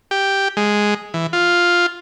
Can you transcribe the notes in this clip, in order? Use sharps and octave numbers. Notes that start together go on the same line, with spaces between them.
G4
G#3
E3
F4